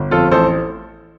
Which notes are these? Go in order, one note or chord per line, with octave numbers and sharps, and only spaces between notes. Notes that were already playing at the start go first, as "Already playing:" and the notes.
Already playing: G1
F2 F4 A4
A1 A4 C5